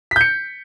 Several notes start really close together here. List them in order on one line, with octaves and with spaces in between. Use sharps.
B6 G6 C#7